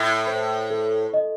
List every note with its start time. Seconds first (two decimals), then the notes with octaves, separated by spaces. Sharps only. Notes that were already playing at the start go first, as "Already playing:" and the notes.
Already playing: A2 E5
0.27 C5
0.70 A4
1.14 D#5